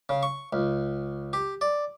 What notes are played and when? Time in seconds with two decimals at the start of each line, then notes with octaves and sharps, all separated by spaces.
0.09 C#3
0.23 C#6
0.53 C#2
1.33 G4
1.61 D5